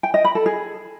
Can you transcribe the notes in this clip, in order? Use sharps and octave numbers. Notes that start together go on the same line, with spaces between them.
G5
D#5
B5
A4
G#4